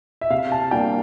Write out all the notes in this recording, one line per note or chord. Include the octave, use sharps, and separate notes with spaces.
E5
C3 F5
A5
G3 A#3 D4 G5